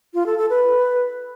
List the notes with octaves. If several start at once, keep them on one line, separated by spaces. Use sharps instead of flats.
F4
A4
A4
B4